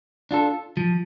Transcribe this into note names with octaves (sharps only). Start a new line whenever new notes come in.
D4 F4 A4
F3